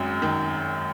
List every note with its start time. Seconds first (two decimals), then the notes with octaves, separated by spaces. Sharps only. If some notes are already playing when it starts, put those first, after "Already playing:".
Already playing: G#1 F#2
0.22 D#3